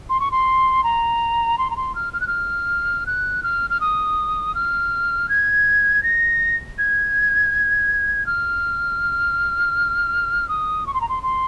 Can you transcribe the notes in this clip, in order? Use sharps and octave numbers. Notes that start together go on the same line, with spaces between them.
C6
C#6
C6
A#5
C6
A#5
C6
F6
F6
F#6
F6
F#6
F6
F6
D#6
F6
G#6
A#6
G#6
F6
D#6
C#6
C6
A#5
C6
C6